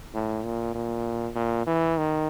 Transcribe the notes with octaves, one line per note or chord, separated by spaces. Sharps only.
A2
A#2
A#2
A#2
E3
D#3